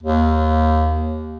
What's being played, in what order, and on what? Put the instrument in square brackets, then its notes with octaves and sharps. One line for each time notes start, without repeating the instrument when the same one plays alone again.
[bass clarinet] D#2